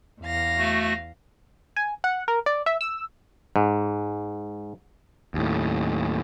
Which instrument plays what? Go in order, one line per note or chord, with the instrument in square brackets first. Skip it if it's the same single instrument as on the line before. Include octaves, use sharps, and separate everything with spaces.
[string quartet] E2 F5 A#6
[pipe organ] A3 F#4
[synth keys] G#5
F#5
A#4
D5
E5
E6
[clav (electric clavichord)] G#2
[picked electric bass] D#2 A2